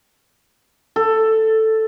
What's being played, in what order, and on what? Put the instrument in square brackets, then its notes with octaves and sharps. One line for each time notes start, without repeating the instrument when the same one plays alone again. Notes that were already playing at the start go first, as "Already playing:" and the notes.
[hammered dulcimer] A4